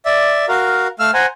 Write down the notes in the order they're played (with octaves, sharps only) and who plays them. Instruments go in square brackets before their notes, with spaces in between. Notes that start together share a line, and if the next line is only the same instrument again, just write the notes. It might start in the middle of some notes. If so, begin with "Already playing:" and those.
[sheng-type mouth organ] D5 E5
F#4 A#4 F5
A3 F5 E6 F6
C5 F#5 G#5 A#5